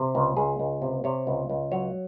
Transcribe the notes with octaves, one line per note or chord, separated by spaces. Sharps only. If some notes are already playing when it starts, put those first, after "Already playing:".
Already playing: C3
C#2
C#2 G#4
C#2
C3
C3 C#5
C#2
C#2
F#3 C#5